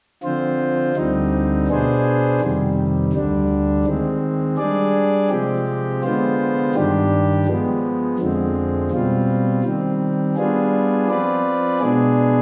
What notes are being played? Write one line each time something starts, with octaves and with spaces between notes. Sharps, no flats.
D3 F3 C4 F4 C5
D2 D3 G3 C4 D#4
B2 B3 D4 G#4 C5
F2 C3 D#3 G3
D2 D3 G3 D4
D#3 G#3 C4
G3 D4 G#4 D5
C3 F3 G#3 C4 G4
D3 G#3 B3 F4 C5
G2 D#3 G3 D4 G4
F3 G#3 B3
F2 D3 F3 G#3 C4
B2 G3 C4 F4
D#3 G3 C4
G3 B3 D4 F4 G#4
F3 C4 F4 B4 D5
B2 G#3 B3 D4 G#4